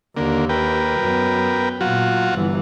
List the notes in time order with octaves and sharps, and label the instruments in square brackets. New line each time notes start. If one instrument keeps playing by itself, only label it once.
[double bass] D#2 [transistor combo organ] D3 A#3
[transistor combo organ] A#4 B4 G5
[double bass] F#2 B3
[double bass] A#2 [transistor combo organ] F#3 F4 F#4
[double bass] G1 E3